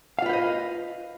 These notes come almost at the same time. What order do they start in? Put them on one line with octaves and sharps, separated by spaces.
F5 F4 B4 C5 D#5